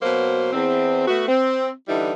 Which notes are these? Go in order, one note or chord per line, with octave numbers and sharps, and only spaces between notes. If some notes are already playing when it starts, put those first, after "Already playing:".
B2 F#3 A#3 C5
E2 C4
A3 B3 F#4
C4
D3 E3 G3 D#4 E4